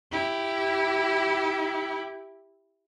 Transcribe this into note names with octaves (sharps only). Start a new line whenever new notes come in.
E4 G4